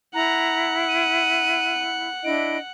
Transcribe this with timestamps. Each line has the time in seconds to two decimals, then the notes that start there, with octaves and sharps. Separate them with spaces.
0.14 E4 F#5 A#5
0.88 D#7
2.24 D4 E4 D#5 D7